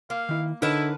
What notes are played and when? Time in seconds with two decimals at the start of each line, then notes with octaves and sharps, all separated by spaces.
0.10 A#3 F5
0.29 D#3 E4
0.62 D3 D#4 E4 A#4 B4 C#5 D#5 A5